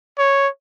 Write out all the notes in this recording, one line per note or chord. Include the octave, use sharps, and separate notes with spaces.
C#5